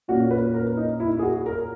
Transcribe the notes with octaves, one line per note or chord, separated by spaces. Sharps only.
A#2 A#3 C#4 F#4
B4
A#4
D#4
E4
G#4
F#4
A#4